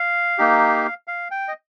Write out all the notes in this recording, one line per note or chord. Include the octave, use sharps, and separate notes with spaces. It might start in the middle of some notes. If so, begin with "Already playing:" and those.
Already playing: F5
A#3 D#4 G4
F5
G5
D#5